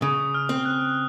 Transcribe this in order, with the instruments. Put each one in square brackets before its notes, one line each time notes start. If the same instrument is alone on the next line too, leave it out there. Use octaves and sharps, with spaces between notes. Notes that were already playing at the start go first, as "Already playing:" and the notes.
[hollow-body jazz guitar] C#3 [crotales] D#6
[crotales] F6
[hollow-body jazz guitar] C4
[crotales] F#6